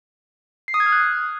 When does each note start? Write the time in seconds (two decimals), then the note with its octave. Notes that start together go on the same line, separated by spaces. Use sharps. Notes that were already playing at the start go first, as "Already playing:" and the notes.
0.68 C7
0.74 D#6
0.80 G#6
0.86 F6
0.92 F#6